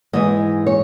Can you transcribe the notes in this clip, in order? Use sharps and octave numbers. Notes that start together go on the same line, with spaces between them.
G#2 E3 G#3 D#5
C#5